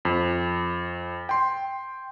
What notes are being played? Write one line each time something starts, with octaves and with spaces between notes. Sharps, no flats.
F2
G5 C6